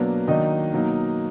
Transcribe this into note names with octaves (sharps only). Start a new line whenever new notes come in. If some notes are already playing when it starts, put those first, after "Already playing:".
Already playing: B2 F#3 A#3 B3 D4
D#3 F#3 A#3 D4 D#4 D#5
B2 F#3 A#3 D#4